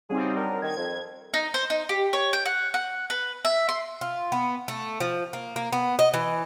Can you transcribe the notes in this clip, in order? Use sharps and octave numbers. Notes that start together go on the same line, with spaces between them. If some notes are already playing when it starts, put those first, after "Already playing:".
C#3 G3 C4 D#4 F#4 G#4
F#3 D4 A#4
D#3 G#6
F2
D#4
C5
D#4
G4
C#5
G5
F#5
F#5
B4
E5
C6
F4
B3
A3
F3
A#3
A#3
B3
D#5
E3